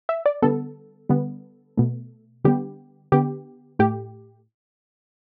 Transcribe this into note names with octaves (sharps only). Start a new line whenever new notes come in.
E5
D5
D3 G3 B3 A4
D3 G3 B3
B2 A3
D3 G3 B3 G4
D3 B3 G4
A2 A3 G4